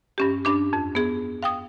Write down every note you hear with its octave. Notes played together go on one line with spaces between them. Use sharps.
G2 C#4 G4
G2 D4 D6
F2
B3 G#4
F5 G5 D#6